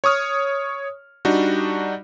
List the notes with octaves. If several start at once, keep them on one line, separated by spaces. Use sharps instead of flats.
C#5 C#6 D#6 F6
G3 D4 D#4 F#4